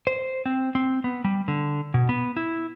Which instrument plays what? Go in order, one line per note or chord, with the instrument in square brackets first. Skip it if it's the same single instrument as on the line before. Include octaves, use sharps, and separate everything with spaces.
[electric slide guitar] C5
C4
C4
B3
G3
D3
B2
B3
E4